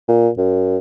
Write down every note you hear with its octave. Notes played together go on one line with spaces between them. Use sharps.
A#2
F#2